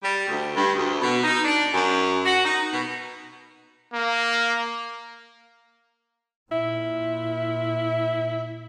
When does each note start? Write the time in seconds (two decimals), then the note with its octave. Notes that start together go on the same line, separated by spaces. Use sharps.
0.02 G3
0.28 D2
0.55 G2
0.75 D2
1.01 B2
1.23 D#4
1.43 D4
1.73 F#2
2.25 F#4
2.44 D#4
2.71 B2
3.93 A#3
6.52 A#2 E4